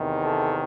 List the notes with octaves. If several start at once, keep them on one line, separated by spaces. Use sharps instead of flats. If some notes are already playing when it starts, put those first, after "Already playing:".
Already playing: E2 C3 D#3
A4